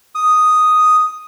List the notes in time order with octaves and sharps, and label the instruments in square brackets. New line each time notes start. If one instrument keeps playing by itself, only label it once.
[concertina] D#6